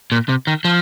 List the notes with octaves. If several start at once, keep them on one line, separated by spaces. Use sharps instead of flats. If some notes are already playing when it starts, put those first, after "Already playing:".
A#2
C3
D#3
F3